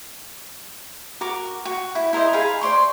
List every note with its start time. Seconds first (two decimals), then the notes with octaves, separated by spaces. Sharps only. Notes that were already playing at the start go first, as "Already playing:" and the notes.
1.21 F#4 A#4 D6
1.65 F#4
1.95 E4
2.13 E4 A#4 C5 D#5
2.33 G#4 F5 A#5 B5
2.61 C5 D5 C6 C#6